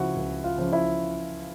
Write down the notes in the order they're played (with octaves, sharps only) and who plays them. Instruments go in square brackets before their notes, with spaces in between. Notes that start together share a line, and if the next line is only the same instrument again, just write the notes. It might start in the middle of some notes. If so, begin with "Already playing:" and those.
Already playing: [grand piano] C#2 C#3 F3 E4 F#4 E5 F#5
C#2
F4 F5
C#3 F3
E4 E5